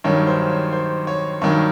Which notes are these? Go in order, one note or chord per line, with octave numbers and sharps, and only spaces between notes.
G2 D#3 F#3 C#5
C5
C#5
C5
C#5
G2 D#3 F#3 C#5